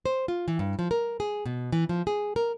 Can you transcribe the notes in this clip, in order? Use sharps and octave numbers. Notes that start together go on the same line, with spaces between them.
C5
F4
E3
G2
F3
A#4
G#4
B2
E3
F3
G#4
A#4